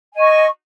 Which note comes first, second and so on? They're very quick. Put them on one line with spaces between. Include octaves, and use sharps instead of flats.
G#5 D#5 C#6